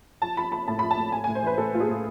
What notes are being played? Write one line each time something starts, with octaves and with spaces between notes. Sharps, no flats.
F3 A5
F3 B5
F3 B5
A2 A5
F3 B5
A5
A2
A2 G#5
A2 G#5
C5
E3 B4
A2 A4
A2 F4
G#4
A2